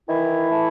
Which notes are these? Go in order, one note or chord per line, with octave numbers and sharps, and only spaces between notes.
D#3 E3 E4
A3